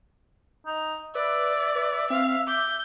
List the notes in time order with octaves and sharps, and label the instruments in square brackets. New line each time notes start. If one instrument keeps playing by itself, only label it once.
[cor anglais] D#4
[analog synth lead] B4 [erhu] D5 [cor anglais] E5
[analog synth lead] B4
[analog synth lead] C4 [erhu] F5
[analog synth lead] D6 [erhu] G6